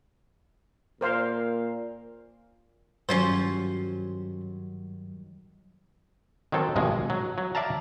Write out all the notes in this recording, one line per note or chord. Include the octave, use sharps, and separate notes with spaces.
A#2 A#4 C5 F5
G2 D#3 F#3 G3 C#4 F4 C5
D#3 F#3 C4 A4
G#1 G2 B2 E3 F3 G#3
F#3
F#3
D5 E5 F5 A5 A#5